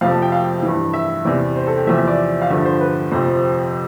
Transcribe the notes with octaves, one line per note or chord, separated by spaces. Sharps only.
F2 C3 F3 F5
A5
G5
F5
G2 E3
E5
E2 C3 E3 D5
C5
A4
G4
E2 C3 F3 E5
E5
D5
F5
G2 D3 F3 E5
C5
B4
F2 C3 F3 C5